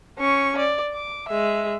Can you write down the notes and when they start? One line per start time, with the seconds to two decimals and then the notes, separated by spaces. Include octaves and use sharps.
0.19 C#4 C#6
0.58 D5
0.94 D6
1.29 G#3 E5